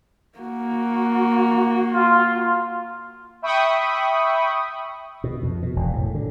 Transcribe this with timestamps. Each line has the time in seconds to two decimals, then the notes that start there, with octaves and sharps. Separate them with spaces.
0.38 A#3 F#4
1.93 F4
3.42 E5 G5 B5 C#6 D#6
5.24 B2
5.43 F2
5.62 B2
5.76 E1
5.93 A2
6.14 D3